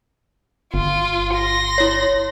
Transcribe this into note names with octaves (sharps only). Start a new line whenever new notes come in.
G1 F4
C6 A#6
E4 C#5